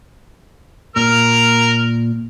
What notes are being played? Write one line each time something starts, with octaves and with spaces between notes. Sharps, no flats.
A#2 A#4 F6